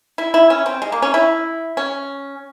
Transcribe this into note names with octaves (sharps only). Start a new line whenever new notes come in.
E4
E4
C#4
C4
G#3
A#3
C#4
E4
C#4